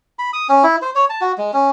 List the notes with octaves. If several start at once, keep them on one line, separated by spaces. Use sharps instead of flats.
B5
D#6
C#4
E4
C5
C#5
A5
F#4
G#3
C#4